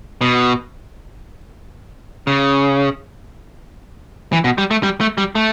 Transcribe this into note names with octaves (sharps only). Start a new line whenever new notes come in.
B2
C#3
E3
B2
G3
A3
G3
A3
G3
A3